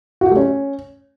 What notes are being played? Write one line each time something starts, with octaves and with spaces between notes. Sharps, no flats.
F#4
G4
A3
C#4